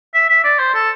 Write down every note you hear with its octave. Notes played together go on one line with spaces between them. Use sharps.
E5
E5
D5
C5
A4